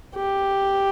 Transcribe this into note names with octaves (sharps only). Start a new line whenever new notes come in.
G4